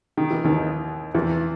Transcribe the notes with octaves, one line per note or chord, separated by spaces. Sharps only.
D#3
E3
D#2 D#3
E2 E3